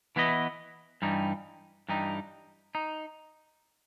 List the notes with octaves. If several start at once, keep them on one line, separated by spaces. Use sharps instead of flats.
E3 B3 E4 B4 D#5
G2 E3 G3 D#4
G2 E3 G3 D#4
D#4